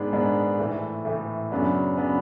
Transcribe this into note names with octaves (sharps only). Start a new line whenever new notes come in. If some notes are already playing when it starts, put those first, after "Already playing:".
Already playing: G#2 D#3 G#3 B3 D4
G#2 D#3 G#3 B3 D4
A2 E3 A3
A2 E3 A3
F#2 C#3 F#3 B3 D4
C#3 F#3 B3 D4